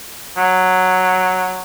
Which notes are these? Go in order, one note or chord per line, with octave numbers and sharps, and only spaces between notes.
F#3